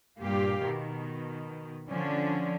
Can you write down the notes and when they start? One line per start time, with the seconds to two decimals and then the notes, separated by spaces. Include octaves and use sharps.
0.18 G2 A#2 G4 F5
0.63 B2 D#3
1.89 D3 F3 C#4 D4